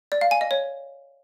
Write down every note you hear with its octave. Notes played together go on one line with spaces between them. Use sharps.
D5
F5
G#5
D#5
C#5